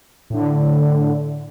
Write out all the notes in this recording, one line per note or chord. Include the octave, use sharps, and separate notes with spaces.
A2 D3